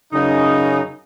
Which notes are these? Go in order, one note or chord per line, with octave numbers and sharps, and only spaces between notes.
F#2 C#3 D#4